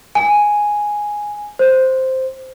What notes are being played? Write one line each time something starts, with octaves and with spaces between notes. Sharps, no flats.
G#5
C5